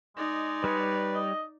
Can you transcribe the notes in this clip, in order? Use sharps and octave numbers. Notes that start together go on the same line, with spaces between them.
G#3 D#4 D5
G3 B4 C#5
D#5